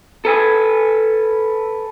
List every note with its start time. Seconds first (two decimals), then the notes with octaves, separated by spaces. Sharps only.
0.25 A4 B4 G#5